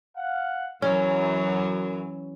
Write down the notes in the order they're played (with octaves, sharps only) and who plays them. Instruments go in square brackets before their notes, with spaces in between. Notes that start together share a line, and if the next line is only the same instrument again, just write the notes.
[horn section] F5 F#5
[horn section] F#2 [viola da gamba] E3 F#3 [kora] C#4